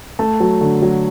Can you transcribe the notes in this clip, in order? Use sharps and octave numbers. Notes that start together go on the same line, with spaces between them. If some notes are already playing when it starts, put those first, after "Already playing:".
A3 A5
F#3
D3
F#3